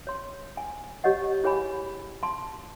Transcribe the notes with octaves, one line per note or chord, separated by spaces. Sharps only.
C#5 C6
G#5
G4 C#5 D#5 F#5
E4 G#4 C#5 G#5 B5
A5 C6